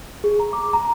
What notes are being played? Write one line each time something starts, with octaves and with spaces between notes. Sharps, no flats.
G#4
A#5
D6
A#5